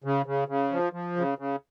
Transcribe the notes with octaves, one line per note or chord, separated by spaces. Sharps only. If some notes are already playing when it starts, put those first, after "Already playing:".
C#3
C#3
C#3
F3
F3
C#3
C#3